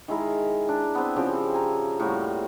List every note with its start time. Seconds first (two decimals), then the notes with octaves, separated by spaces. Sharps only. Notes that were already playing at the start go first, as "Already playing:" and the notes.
0.08 D#3 G#3 E4 A#4
0.69 D4
0.95 B3 C4
1.16 C#3 F3 C4 G4
1.53 G#5 A#5
2.00 A2 G3 A#3 F#4